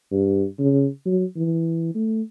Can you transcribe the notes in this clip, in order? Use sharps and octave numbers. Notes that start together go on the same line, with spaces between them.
G2
C#3
F#3
E3
A3